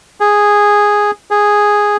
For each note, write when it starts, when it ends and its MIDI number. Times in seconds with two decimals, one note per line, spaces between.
0.20 1.11 68
1.31 1.97 68